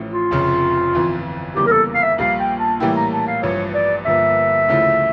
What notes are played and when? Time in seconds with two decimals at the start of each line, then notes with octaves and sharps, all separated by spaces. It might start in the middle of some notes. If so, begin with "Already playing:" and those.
Already playing: A1 A2 F3 C#4
0.10 F4
0.31 F1 F2 C#3
0.93 G1 F2 E3
1.56 E2 C#3 E3 G3 A#3 G4
1.67 A#4
1.72 A4
1.94 F5
2.03 E5
2.18 A#1 A#2 G3 F5
2.39 G5
2.60 A5
2.80 A2 E3 G3 A#3 E4 G5
2.96 A#5
3.12 A5
3.27 F5
3.42 A1 G2 F3 C#5
3.74 D5
4.05 G1 G2 F3 A#3 E5
4.68 D2 C#3 F3 A3 E4